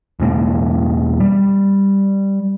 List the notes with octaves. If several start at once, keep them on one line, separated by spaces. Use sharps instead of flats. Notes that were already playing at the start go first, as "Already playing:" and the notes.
E2 B2 G#3 A#3
G3